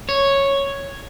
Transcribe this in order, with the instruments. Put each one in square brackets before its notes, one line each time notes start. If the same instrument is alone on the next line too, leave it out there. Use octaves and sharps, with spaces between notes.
[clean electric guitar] C#5